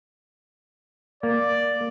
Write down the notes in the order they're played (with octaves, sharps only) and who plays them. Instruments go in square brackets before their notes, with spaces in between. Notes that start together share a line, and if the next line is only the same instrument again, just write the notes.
[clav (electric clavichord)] A#3 [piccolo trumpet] D5